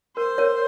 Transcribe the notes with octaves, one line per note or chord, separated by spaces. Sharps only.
A#4 C5
A#4 C#5